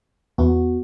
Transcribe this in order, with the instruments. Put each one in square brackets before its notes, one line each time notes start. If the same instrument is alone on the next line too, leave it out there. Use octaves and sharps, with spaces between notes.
[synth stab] E2 [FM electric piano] B3 F#4